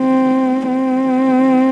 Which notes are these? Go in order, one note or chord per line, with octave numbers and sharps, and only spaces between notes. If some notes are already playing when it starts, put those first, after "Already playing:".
Already playing: C4
C4